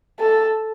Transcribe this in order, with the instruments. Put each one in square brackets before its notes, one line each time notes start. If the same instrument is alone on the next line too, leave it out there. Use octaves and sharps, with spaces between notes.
[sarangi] A4